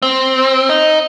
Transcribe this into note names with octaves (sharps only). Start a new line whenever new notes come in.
C4
D#4